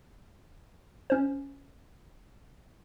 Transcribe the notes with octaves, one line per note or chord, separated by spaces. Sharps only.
C#4 C5